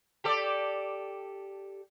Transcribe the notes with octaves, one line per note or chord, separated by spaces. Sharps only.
G4 A4 D5